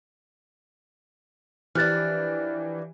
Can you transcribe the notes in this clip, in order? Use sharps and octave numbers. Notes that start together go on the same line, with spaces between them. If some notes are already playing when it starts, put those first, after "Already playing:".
E3 F3 D4 G4 F6 F#6 A6